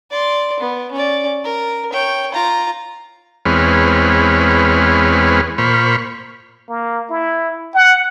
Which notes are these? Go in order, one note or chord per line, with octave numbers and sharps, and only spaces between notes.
D5 C6
B3
C#4 D5
A#4
C#5 G5
F4 A#5
E2 G#3 C4 B4 C#5 F6
A#2 C5 B5 C#6 F6
A#3
E4
F#5